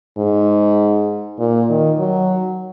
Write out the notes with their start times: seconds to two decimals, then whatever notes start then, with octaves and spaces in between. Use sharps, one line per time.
0.18 G#2
1.39 A#2
1.70 D#3
1.99 F#3